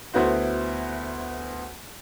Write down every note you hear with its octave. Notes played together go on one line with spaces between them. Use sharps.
D2 B3 E4 F#4 C5